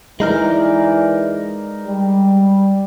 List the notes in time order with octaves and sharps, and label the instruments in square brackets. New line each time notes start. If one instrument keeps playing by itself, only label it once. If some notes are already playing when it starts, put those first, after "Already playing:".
[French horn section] E3 D5 [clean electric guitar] G#3 D#4 A#4
[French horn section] G3